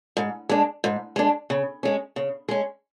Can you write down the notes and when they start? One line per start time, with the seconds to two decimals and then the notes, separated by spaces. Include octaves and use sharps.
0.17 G#2
0.49 G#3 D4
0.84 G#2
1.16 G#3 D4
1.50 C#3
1.83 G#3 C#4
2.16 C#3
2.49 G#3 C#4